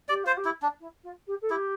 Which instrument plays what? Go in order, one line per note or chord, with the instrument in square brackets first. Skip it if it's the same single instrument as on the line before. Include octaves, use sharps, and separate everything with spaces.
[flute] G4 [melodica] D5
[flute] F4 [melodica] C5
[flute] G4
[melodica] E4
D4
[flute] E4
F4
G4
A4
[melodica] E4 [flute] G4